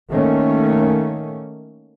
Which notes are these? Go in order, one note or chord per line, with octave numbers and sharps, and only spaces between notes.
D#3 A3 A#3 C#4